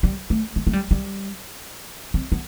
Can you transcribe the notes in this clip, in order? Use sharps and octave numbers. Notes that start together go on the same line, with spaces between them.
G3
A3
A3
A3
G3
G3
C4
B3